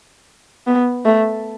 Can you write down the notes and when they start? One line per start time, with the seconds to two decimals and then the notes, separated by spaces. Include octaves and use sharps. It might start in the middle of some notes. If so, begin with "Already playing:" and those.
0.67 B3
1.05 A3